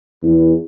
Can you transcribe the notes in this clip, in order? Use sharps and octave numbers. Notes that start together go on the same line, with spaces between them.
E2